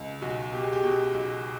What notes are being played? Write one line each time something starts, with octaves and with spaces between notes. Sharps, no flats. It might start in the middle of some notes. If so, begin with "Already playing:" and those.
Already playing: C#2
B1 F#4
B2 G4
G#4
G4
B2
B1